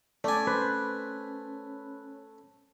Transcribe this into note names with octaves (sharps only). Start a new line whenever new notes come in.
A3 C#4 D5 G#5
B4 C5